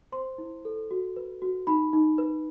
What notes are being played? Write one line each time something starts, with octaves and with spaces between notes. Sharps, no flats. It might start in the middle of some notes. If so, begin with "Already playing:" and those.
C5 C6
E4
A4
F#4
B4
F#4
D#4 B5
D#4
B4